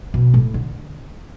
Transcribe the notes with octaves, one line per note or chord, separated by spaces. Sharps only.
B2
A2
D3